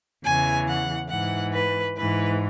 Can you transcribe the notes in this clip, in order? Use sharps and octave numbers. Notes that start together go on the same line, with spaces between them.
E2 C#3 E3 G#5
F#5
G#2 E3 F#5
B4
G#2 E3 B4